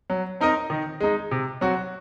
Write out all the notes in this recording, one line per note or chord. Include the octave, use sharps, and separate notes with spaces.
F#3
C4 D#4 A#4 D#5
D#3
G#3 D#4
C3
F#3 C4 F#4